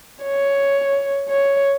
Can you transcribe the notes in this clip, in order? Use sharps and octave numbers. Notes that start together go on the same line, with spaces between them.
C#5
C#5